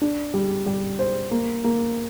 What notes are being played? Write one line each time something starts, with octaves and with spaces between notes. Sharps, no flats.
D4
G3
G3
C5
A#3
A#3